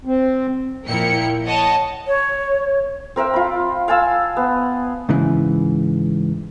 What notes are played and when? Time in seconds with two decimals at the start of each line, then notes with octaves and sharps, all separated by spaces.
0.05 C4
0.85 A#2 F3 E4 A#4 G5 C#7
1.46 C#5 D#5 F#5 A5
2.07 C#5
3.16 C4 A#4 E5 G5
3.34 F4 B5
3.88 F5 G#5 A5 E6
4.37 B3
5.09 G#2 C#3 E3